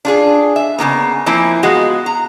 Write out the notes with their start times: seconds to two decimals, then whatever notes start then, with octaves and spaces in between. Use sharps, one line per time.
0.05 D4 F4 G#4
0.56 E5
0.79 C#3 E3 A#3 B3
1.26 E3 F3 A#3 C4 E4
1.63 G#3 B3 F4 F#4
2.06 A#5